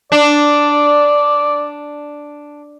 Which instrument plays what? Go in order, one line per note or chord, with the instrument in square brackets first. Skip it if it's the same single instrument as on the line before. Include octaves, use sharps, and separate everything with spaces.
[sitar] D4 [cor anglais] D5